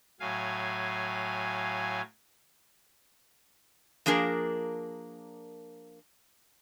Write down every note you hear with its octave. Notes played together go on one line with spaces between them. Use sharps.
A2 F#3 F5 G#5
F3 A#3 D4 G#4 A#4